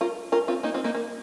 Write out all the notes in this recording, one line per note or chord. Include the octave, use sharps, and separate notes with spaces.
F4 A#4
F4 A#4
C4 F4
A#3 D#4
C4 F4
A#3 D#4
A#3